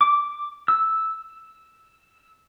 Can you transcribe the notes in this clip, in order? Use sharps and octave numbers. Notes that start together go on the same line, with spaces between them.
D6
E6